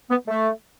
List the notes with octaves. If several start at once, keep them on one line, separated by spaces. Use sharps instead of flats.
B3
A3